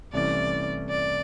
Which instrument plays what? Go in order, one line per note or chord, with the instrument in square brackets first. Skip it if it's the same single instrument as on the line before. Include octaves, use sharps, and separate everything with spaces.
[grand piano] C2 C3 E3 A3 C#4 [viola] D5
[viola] D5